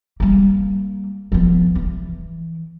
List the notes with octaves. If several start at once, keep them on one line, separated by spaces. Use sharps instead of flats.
G3 A#3
F3 B3
E3